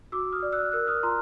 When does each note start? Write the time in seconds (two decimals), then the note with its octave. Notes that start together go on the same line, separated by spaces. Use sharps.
0.12 F#4 D6 E6
0.32 D#6 F6
0.42 D5
0.52 E6 F#6
0.72 A#4 E6 F#6
0.87 D#6 F6
1.03 F4 A#5 C6